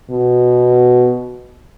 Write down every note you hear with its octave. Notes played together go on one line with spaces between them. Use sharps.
B2